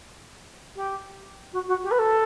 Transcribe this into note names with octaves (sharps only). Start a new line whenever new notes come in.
G4
F#4
F#4
G4
B4
A4